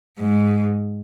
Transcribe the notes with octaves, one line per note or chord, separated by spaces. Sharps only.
G#2